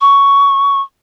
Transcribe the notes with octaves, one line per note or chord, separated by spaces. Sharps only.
C#6